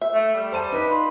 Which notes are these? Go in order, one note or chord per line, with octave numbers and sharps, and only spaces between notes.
E5
A3
G3
C5 A5 D#7
D#4 B4
F4 B5